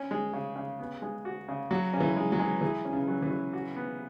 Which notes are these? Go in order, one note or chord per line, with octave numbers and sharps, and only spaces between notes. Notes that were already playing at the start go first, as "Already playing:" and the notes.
Already playing: C#4
G#3
C#3
C#3
B3
G#3
F#4
C#3
F#3 F#4
C#3 C#4
E3
G#3
F#3
G#3
E3 G#4
C#4
C#3
F#3
E3
F#3
F#4
B3